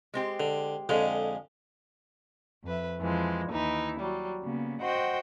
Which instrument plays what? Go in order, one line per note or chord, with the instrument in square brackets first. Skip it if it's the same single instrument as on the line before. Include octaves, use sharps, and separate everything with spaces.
[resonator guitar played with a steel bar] G#3 C4 G4
[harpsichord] D3
[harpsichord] F2 D3 [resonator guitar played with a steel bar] G#3 G#4
[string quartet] F2 B4 E5
F2 E3 F3 G#3
D#2 E3 D#4 E4
F#3 G3
C#3 A#3 B3
F#4 C5 D#5 F#5 G5 C6